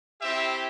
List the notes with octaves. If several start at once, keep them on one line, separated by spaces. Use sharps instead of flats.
C4 E4 G4 E5